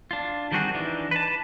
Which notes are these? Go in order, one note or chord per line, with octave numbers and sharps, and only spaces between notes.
D4 F4
D#3 G3 C4 F#4 G#4
E3 D4 D#4
B4 A5